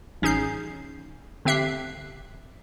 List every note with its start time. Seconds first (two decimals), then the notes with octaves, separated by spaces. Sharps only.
0.22 A1 C#4 D#4 G#4 G6 C7
1.45 D3 C4 G4 E5 F#6 C7